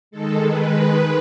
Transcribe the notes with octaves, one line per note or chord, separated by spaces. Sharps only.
D#3 G#3 A4
B4